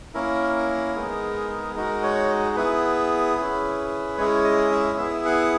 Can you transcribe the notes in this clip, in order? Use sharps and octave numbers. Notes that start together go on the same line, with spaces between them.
A#3 C#4 E4 A#4
G#3 B3 D#4 G#4
G#3 D#4 F#4 A#4
C#5
B3 E4 G#4 B4
C#4 E4 G#4
G#3 C#4 E4 G#4 C#5
D#5
E5
B3 E4 G#4 E5
F#5